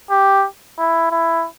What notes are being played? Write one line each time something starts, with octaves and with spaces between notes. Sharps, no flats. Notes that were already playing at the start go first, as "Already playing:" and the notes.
G4
E4
E4